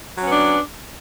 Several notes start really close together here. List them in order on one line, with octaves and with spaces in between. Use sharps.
F#3 C#4 B3 D4